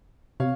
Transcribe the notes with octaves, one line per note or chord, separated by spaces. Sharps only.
C3 C#5 F5